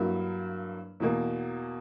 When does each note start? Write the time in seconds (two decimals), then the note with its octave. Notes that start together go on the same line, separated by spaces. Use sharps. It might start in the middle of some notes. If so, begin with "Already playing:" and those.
Already playing: G2 F#3 A#3 E4
1.00 E2 B2 A#3